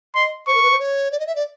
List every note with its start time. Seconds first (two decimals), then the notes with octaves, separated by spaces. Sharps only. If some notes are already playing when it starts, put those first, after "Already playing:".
0.15 D#5 C6
0.47 C5 C#6
0.55 A#4
0.63 B4
0.71 C5
0.79 C#5
1.12 D5
1.19 D#5
1.27 E5
1.35 D5